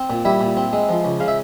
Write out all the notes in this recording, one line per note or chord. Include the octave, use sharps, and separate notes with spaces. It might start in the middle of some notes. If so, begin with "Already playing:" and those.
Already playing: C4
A#2
G3 E4 E5
A#2
C4
G#3
F3
C#2
C#3 F5
E5